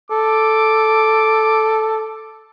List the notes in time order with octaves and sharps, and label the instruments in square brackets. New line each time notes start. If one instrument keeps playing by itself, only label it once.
[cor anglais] A4 [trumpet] D6